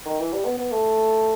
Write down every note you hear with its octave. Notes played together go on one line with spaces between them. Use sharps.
D#3
E3
G3
B3
B3
A3